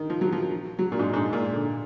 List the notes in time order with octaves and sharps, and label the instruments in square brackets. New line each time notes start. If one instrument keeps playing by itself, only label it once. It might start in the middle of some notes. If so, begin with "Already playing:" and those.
Already playing: [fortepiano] D#3
F3
F#3
F3
F#3
A#2
G#2
G#2
A#2
D3